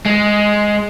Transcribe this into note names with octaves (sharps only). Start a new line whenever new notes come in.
G#3